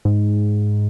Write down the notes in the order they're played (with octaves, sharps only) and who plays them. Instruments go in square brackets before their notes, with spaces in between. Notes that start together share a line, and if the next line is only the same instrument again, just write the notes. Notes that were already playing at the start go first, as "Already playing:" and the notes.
[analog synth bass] G#2